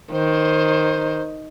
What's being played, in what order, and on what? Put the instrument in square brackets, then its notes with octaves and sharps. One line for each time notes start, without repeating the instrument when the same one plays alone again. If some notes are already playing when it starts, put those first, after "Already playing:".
[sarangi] D#3 [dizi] C5